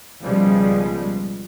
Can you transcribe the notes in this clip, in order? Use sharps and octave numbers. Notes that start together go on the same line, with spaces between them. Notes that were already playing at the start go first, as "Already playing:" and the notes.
C#2 B2 F3 G3 G#3